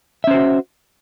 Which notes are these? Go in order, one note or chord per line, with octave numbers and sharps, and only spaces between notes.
C#4 F#4 C5 E5